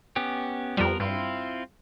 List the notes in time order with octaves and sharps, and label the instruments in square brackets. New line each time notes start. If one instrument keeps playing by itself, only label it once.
[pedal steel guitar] B3 C#4 G4
[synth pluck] F2 G3 [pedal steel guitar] F3 B3 A#4
[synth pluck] G2 [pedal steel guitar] C4 E4 F4